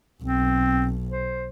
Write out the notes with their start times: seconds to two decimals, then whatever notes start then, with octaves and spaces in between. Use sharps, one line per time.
0.23 B1 C4
1.11 C5